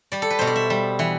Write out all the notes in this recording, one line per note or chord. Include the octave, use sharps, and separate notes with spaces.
G3 D5
A4
B4
B2 C5
D5
E5
G3
E3 F#5